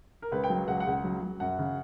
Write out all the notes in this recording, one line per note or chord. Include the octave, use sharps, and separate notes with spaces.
A#4
C#2 B4
G5
F#3
C#2 F#5
F#5
C#2
F#3
F#3
F#2 F#5
C#3